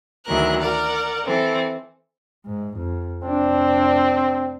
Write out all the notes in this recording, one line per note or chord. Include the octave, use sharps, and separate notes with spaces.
D2 D#3 E3 F#3 A#4 F#6
A#4 D5 F#5
E3 C4 A4
G#2
F2
F1 C4 D4